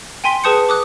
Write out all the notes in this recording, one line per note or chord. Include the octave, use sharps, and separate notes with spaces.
G5 G#5 C6 B6 G7
G#4 B4 A5 D#6 G6 C#7
D6 D#6 F#6